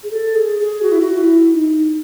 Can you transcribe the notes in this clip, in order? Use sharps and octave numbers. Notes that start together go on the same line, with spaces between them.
G#4
A4
G#4
G#4
F#4
E4
F#4
E4
D#4